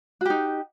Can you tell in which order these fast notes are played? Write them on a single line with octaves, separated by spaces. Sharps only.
F#4 G4 D#4